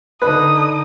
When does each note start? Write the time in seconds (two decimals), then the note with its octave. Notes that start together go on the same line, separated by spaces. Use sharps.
0.22 D3 D#4 B4 D#6